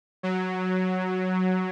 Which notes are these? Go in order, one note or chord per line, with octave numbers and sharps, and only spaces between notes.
F#3